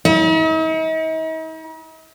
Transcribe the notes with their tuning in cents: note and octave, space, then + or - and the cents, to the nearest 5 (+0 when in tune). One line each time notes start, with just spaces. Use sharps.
D#4 +45